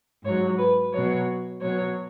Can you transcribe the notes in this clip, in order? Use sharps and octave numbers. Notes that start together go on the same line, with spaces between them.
G#2 F#3 C#5
B4
B2 F#3 C#5
B2 F#3 C#5